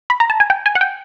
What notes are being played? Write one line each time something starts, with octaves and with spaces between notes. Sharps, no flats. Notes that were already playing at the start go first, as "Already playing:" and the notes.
B5
A#5
A5
G#5
G5
G#5
F#5
G5